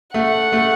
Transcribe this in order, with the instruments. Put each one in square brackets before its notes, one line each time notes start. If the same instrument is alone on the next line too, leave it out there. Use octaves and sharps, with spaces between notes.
[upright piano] A3 [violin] F#5
[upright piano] A3